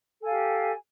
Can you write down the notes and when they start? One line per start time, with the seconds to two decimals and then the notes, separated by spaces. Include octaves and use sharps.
0.19 A4
0.23 G#5
0.26 F5
0.30 G4